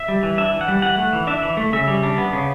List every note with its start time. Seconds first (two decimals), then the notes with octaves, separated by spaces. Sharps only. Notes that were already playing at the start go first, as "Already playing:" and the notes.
Already playing: E5
0.08 G3
0.23 E3
0.38 D4 E5
0.53 E3
0.61 F#5
0.68 G3
0.82 E3 F#5
0.98 A3
1.13 E3
1.27 D4 E5
1.42 E3
1.57 A3
1.73 C#3 E5
1.88 G3
2.03 D4
2.18 B3
2.33 C#3